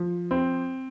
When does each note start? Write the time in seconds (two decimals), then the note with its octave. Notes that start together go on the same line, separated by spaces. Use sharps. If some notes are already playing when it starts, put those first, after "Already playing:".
Already playing: F3
0.31 C4